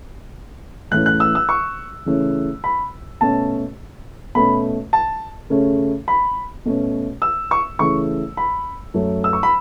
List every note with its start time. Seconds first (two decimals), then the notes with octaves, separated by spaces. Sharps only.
0.91 A2 E3 A3 C#4 F#6
1.06 F#6
1.20 E6
1.35 E6
1.49 C#6
2.06 C#3 E3 A3 C#4
2.64 B5
3.21 B2 A3 C#4 A5
4.35 B2 A3 C#4 B5
4.93 A5
5.50 C#3 A3 C#4
6.08 B5
6.65 B2 A3 C#4
7.22 E6
7.51 C#6
7.79 C#3 E3 A3 C#4 C#6
8.37 B5
8.94 F#2 F#3 A3 C#4
9.24 E6
9.33 C#6
9.43 B5